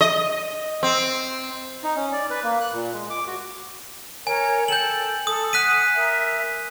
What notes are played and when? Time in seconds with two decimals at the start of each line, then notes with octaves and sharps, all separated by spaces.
0.01 D#5
0.83 C4
1.83 D#4
1.96 C#4
2.12 D5
2.30 B4
2.44 A#3
2.61 F#6
2.73 A#2
2.94 G#3
3.10 D6
3.27 F#4
4.27 A#4 C#5 G#5
4.68 A4 G5 G6 F#7
5.27 A4 D#6
5.53 F#5 G#5 D#6 F#6 B6 D#7
5.96 A#4 E5